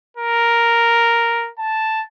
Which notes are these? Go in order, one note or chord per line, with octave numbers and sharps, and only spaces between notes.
A#4
A5